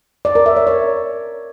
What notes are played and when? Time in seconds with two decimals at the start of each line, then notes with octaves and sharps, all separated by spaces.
0.25 D5
0.35 A#4
0.46 E5
0.56 C#5
0.67 C#5